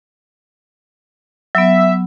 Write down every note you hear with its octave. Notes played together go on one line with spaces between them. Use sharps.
F#3 B3 E5